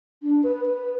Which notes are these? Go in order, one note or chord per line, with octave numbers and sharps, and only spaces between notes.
D4
B4
B4